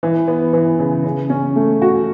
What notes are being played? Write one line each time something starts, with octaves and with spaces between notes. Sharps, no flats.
E3
B3
E3
C#3
C#3
C#4
A3
F#4